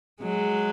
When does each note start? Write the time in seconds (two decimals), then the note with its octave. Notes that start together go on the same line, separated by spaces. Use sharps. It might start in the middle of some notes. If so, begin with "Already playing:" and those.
0.22 F#3 G#3